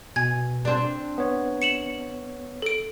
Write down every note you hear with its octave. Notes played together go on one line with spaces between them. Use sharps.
B2 G#5 G#6
C4 D4
B3 C#5
C#7 E7 F#7
A4 D7